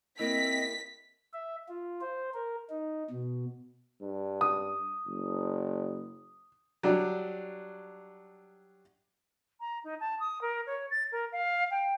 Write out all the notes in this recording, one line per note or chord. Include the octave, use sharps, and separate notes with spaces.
A#3 C4 E4 D#5 B6
E5
F4
C5
A#4
D#4
B2
G2
D#6
F#1
F#3 G3 D4
A#5
D#4
A5
D#6
A#4
C#5
A6
A#4
F5
G5